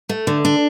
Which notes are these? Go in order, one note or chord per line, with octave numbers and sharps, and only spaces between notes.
A3
D3
D4